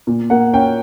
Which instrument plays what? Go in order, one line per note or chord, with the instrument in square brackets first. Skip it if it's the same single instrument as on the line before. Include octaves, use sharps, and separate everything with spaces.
[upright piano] A#2
A#3 F#5
C#4 G5